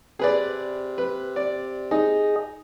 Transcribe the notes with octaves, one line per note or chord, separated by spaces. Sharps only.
C3 G#4 B4 D5
B4
D5
D#4 G#4 D#5